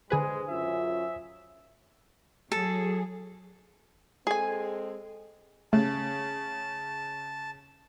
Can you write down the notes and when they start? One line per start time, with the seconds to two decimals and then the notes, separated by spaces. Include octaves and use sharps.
0.10 D3 G#3 G#4 B4 C5 G#5 D#6
0.49 F#2 C#4 F4 E5
2.52 F#3 G#4 A4
4.27 G#3 C4 G#4 A4 G#5
5.73 C#3 A3 A5